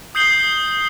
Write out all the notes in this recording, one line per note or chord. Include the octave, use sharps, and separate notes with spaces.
D#6 G6 C7 F#7 G7